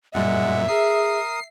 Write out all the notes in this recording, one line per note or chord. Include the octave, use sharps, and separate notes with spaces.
F#2 A#2 G3 G#3 E5 F#5
G#4 A#4 D#6 C7